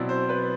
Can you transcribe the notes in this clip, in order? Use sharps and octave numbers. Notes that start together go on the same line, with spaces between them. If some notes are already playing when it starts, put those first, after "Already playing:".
Already playing: B2 F#3 C4 E4 D5
C5
B4